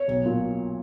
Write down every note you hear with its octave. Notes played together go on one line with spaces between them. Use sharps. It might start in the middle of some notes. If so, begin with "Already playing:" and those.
Already playing: C#5
B1
A#2